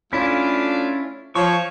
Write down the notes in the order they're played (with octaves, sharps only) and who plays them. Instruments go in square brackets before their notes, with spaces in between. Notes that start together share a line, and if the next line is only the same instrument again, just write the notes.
[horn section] A3 D4 F4 [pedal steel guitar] C#4 E4
[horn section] F3 C#5 [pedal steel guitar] C#6